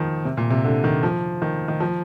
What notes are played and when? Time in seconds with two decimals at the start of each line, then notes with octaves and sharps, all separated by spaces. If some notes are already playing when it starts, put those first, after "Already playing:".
Already playing: D#3 F3
0.25 C3
0.37 A#2
0.50 C3
0.64 D3
0.84 D#3
1.03 F3
1.42 D#3
1.68 D#3
1.80 F3